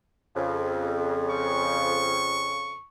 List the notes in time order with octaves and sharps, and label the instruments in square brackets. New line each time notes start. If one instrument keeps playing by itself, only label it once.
[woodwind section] F2 C#3
[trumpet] C#6